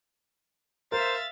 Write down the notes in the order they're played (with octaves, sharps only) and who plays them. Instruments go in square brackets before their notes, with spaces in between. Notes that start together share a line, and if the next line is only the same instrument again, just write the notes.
[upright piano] A#4 [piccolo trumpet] C5 [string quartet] E5 F5 [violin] A6